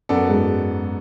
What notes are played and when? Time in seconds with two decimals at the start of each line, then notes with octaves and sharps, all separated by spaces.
0.09 F#2 B3 F#4 A4 D5
0.28 G#2